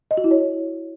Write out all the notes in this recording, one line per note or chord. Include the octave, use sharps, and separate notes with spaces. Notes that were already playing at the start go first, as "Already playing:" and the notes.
D#5
F#4
E4
C#5